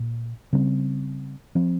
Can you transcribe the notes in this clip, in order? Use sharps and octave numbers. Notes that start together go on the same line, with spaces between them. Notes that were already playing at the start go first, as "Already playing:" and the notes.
Already playing: A#2
C#3 G3 C4
F3 C4